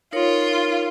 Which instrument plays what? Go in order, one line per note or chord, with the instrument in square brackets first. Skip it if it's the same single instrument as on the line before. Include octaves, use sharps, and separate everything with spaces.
[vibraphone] D#4 A#4 C#5 [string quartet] F4